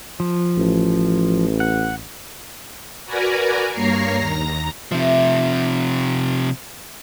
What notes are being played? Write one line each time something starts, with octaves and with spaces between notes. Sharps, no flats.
F3
A1
F#5
F#4 A#4 B4 D5 G#5 A#5
G2 A#3 C#5 A#5 A#6 C7
D#2 A#5 A#6
C3 F3 E5